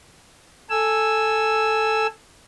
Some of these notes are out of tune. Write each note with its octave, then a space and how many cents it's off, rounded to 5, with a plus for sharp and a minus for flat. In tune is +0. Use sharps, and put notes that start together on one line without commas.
A4 +0 G#5 +0 E6 +5